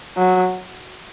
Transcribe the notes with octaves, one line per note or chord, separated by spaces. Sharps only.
F#3